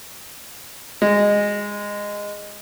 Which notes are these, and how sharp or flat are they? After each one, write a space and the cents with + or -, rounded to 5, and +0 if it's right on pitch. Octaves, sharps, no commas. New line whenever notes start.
G#3 -15